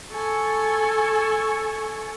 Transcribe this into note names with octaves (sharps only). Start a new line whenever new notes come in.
A4 G#5 C#6